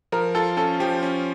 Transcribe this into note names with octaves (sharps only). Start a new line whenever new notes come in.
F3 A#4
F4 A4
C#4 A4
F3 G4
C#4